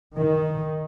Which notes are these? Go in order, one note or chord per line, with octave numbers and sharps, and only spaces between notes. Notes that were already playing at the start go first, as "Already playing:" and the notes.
D#3